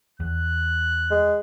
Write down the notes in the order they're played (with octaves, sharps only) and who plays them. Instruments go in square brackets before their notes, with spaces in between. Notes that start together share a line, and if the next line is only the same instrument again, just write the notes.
[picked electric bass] E2 [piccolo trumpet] F#6
[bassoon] G#3